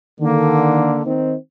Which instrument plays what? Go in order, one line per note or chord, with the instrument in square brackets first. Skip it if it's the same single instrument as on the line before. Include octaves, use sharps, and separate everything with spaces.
[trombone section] D3 [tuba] D#3 [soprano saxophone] A#3
[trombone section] D#3 C4 D#4